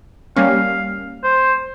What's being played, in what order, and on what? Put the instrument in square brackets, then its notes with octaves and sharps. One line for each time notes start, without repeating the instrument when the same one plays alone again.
[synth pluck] G3 A#3 C#4 [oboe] F5
[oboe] C5